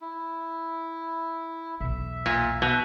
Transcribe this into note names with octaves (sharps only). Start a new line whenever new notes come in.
E4
B1 E2 E5
A#2
B2